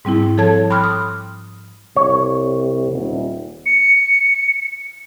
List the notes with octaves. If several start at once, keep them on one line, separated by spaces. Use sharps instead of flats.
G#2 G3 C4 E4
F3 A4 C#5 A5 G#6
G5 B5 C6 D6 F6 F#6
D#6
C2 C#5
D#1
C#7